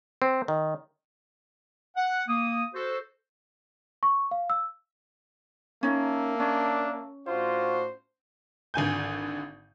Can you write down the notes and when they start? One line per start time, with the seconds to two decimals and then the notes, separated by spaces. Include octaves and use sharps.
0.22 C4
0.48 D#3
1.97 F#5
2.28 A#3 D#6
2.74 F#4 A4 C5
4.03 C#6
4.31 F5
4.50 E6
5.83 A#3 C#4 D#4 A#4 E5 A5
6.40 C#4 D4
7.27 A2 D4 F4 F#4 C5
8.74 G#1 D3 G#5 G6